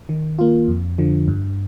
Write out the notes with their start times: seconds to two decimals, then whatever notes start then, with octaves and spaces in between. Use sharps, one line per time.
0.09 D#3
0.39 A#3 F4
0.68 F2
0.98 D3 F3
1.28 G2